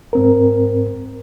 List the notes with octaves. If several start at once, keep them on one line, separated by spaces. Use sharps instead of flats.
G#2 C4 A#4